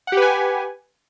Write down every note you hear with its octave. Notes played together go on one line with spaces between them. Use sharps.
G4 B4 F#5 G#5